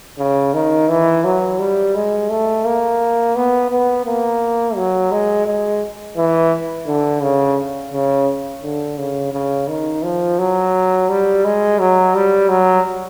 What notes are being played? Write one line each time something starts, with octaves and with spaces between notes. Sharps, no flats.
C#3
D#3
E3
F#3
G3
G#3
A3
A#3
B3
B3
A#3
F#3
G#3
G#3
E3
D3
C#3
C#3
D3
C#3
C#3
D#3
F3
F#3
G3
G#3
F#3
G3
F#3